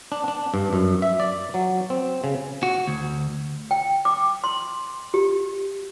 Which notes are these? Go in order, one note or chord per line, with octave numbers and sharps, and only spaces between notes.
D4
D4
G2
F#2
E5
D5
F#3
C4
C#3
F#4
D2
G5
D6
C6
G4